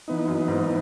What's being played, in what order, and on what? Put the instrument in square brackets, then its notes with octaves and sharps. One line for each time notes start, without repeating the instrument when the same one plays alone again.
[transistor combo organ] E3 B3 D#4
[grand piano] F#2
G#2